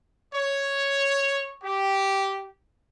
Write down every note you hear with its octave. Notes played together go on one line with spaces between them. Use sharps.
C#5
G4